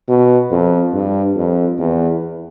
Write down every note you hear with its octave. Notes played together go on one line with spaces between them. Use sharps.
B2
F2
G2
F2
E2